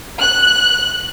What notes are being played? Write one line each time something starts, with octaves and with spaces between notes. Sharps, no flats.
F#6